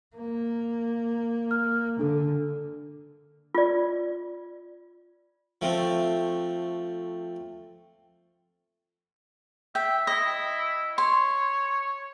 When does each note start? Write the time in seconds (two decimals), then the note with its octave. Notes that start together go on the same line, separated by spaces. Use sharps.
0.16 A#3
1.51 F6
1.99 D3 D4 A4
3.55 F4 D5
5.62 F3 A3 C4
9.75 E5 G5
10.07 E4 D#5
10.98 C#5 C6